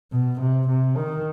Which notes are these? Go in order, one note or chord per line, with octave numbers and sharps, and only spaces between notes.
B2
C3
C3
D#3